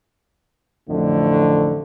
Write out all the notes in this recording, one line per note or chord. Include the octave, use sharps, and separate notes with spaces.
A1 F2 D3 A3